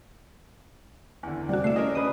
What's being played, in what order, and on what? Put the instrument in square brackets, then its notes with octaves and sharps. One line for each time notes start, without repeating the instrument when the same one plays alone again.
[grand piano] E2 D3
[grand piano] C3 [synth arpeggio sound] G3 F#4 [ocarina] D5
[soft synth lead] A3 [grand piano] D4 E4 A4 [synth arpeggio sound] E5 C7
[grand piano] C#4 A#4 [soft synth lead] D#5
[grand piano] C#3 D4 B4 [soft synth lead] D#6